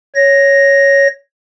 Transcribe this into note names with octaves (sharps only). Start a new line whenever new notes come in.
C#5 A#6